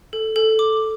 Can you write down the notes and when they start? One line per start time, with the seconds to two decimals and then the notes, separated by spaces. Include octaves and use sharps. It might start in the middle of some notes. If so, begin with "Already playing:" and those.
0.13 A4
0.36 A4
0.59 D6